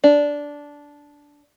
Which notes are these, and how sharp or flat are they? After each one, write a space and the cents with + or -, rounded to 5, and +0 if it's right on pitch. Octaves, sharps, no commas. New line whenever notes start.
D4 -10